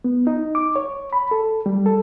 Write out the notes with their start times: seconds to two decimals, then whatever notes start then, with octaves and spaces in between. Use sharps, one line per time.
0.04 B3
0.27 D#4
0.55 D6
0.76 C#5
1.13 B5
1.31 A4
1.66 G3
1.86 A4